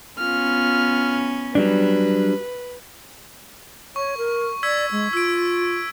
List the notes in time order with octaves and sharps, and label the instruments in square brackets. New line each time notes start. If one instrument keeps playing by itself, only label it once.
[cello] B3 C#4 [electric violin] F4 F6
[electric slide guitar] F#3 G3 D4 [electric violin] B4
[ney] C#5 [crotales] C#6
[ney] A#4
[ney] D5 [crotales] E6 G#6 B6
[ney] G#3
[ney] F4 [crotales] E6 D7